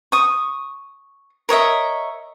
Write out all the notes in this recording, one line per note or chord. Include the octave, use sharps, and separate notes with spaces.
C#6 D#6
A#4 C#5 D#5 E5